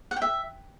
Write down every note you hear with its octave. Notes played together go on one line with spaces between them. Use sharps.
F#5
G5
E5